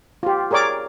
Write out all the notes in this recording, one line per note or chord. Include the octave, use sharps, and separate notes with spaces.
F4 G4
G#4 A#4 C#5 D5 D6